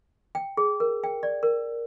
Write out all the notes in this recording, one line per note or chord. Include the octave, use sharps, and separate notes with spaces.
G5
G#4
A#4
G5
D5
A#4